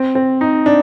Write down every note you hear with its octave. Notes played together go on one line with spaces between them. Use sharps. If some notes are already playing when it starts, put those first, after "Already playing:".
Already playing: C4
C4
D#4
D4